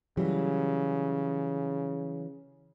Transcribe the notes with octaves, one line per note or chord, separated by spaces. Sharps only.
C#3 E3 F#3 G3